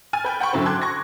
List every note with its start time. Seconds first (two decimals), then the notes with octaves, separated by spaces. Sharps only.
0.13 G#5 F6 A6 D#7
0.24 B4 G5 G#5
0.40 F#5 G5 B5 C#6
0.53 F#2 D3 F#3 E4 C5
0.66 G5 A5 C6 D6 F#6 G#6
0.82 C#6 G#6 A#6